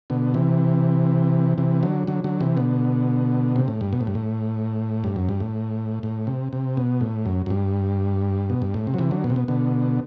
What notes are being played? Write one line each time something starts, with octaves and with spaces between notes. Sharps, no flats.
B2 D3
C3 E3
C3 E3
D3 F#3
D3 F#3
D3 F#3
C3 E3
B2 D3
C3
A2
G2
B2
A2
G2
A2
G2
F#2
G2
A2
A2
C3
C3
B2
A2
F#2
F#2
G2
B2
G2
A2
C3
F#3
C3 E3
D3 F#3
B2
C3
B2
B2 D3